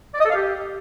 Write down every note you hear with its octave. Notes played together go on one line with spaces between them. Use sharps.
D5
D#5
A4
F5
G4